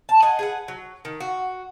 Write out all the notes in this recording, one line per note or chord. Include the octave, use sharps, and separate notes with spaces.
A5
D#5 F#5 G#5 A5
G#4 B4 F#5
F#3
D#3
F#4